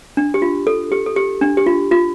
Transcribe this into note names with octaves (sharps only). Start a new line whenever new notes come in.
D4
G4
F4
A4
G4
A4
G4
D4
G4
F4
F4